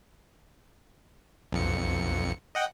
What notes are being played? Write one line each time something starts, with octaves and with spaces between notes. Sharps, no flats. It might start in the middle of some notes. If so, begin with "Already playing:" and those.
B1 F2 C#7
D#5 F#5 G5